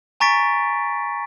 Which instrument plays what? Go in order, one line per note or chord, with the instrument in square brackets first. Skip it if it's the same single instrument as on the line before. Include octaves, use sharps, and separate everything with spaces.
[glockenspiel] G#5 A#5 C#6 A6 B6 D7